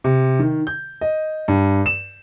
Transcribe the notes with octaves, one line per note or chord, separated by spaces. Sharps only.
C3
D#3
G6
D#5
G2
E7